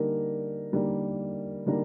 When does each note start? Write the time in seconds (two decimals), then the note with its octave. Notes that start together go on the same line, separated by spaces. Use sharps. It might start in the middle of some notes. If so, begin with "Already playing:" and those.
Already playing: D3 G3 A#3 D#4 A#4
0.72 D3 G3 A#3 D#4 A#4
1.66 D3 G3 A#3 D#4 A#4